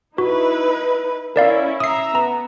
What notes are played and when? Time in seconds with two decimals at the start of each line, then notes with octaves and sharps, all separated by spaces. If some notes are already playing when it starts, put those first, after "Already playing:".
0.18 D#4 E4 F#4 B4
1.36 C#4 E4 A#4 D5 F5
1.80 E5 A#5 D#6 C7
2.15 B3 A#5